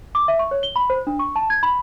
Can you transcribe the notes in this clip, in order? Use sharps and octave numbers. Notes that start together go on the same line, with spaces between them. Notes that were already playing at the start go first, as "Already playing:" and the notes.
D6
E5
C#6
C#5
G7
B5
C5
D4
C#6
A5
G#6
B5